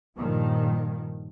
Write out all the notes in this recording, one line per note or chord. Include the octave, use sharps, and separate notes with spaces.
G2 A#2 D#3 F3